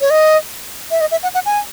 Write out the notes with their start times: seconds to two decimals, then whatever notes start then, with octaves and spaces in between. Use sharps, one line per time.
0.01 C#5
0.10 D#5
0.91 E5
1.01 D#5
1.11 E5
1.23 F#5
1.34 F#5
1.46 G#5